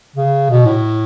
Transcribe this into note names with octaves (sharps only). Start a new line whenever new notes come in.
C#3
B2
A2